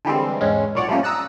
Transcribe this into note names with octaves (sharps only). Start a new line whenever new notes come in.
D3 E3 G3 G#3 C4
E2 G#2 G#3 C#4
B1 A#2 C#5 D5 F#5
F3 G3 A3 A#3 C#4
A#5 D#6 E6 F#6 A6